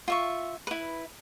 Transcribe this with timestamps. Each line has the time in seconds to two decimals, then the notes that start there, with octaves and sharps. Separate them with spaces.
0.08 F4 E5 C#6
0.67 E4 B4